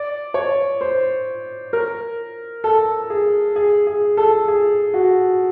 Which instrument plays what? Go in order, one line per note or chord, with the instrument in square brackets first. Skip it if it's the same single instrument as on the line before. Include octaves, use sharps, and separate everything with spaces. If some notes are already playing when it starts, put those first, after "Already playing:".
Already playing: [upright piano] D5
C#5
C5
A#4
A4
G#4
G#4
G#4
A4
G#4
F#4